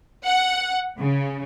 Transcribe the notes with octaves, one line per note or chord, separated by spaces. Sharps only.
F#5
C#3